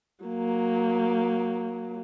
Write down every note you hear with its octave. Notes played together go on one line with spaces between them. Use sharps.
F#3 A#3